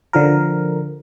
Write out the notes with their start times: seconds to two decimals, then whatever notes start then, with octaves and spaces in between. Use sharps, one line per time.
0.13 D3 F3 A#4